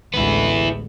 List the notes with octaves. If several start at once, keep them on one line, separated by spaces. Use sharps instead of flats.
A1 D2 G#3 B3 E4